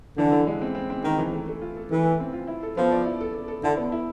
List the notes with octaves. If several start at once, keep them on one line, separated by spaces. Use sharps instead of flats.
D3 E3
E3
G#3
C4
C4
C4
D#3 C4
E3
A3
A3
F4
A4
E3 A3
A4
C4
F4
E4
A4
F3 B3
D5
E4
A4
A4
A4
D3 E4
B3
E4